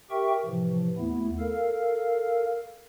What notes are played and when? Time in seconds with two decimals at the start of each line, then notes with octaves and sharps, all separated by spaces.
0.11 G4 A#4 E5 G5 C#6
0.45 A2 C3 E3 F3
0.98 D#2 A3 B3 E4
1.39 A4 A#4 F5